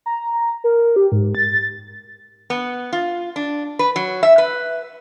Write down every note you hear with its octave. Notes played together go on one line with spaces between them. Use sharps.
A#5
A#4
G4
G#2
A6
B3
F4
D4
B4
F#3
E5
B4